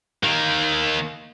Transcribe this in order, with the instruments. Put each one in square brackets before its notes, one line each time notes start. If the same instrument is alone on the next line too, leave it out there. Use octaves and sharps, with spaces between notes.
[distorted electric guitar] D#3 A#3